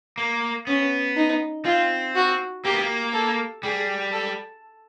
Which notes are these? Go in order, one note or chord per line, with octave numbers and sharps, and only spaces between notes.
A#3
B3 C#4
D#4
C4 F4
F#4
A#3 G4
B3
A#3
A4
G3 G#4
A4